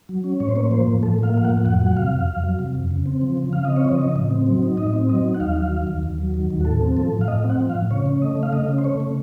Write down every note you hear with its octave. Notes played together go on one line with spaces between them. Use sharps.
F#3
C#4
A2 C#5
C5
A#3 C#5
F3 C5
A2
A2 A4
A#3 F5
F3 F5
F#5
A2
F2 F#5
F#3
F#5
C3 F5
F2
F2
F#3
C3
F2
C#3
C4
F3
C#3
C#3 F5
C4 D#5
C#5
F3 D#5
C#3
A2
C4
F#3
D#4
A2 D#5
C4
F#3 D#5
D#4
F#5
D#2 F5
F#3
D#3
D#2
D#2
F#3
D#3
D#2
F#4
A2 A4
C4
F3 A4
A2
F5
A2 D#5
C4
F#5
F3
F5
A2
C#3 C#5
C#4
A3 D#5
C#3
F5
C#3 D#5
C#4
C5
A3 C#5
C#3